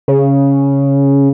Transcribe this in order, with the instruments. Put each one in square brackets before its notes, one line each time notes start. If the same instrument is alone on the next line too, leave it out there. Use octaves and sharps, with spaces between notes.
[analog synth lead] C#3